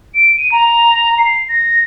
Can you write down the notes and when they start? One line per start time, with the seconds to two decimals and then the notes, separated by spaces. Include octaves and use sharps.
0.14 D7
0.36 D#7
0.51 A#5
1.18 C7
1.48 A#6